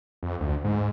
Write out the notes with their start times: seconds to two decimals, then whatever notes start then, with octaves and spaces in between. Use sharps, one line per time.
0.23 F2
0.40 D2
0.64 G#2